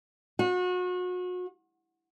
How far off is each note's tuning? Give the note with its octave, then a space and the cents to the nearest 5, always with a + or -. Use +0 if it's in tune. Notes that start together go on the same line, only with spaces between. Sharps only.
F#4 -35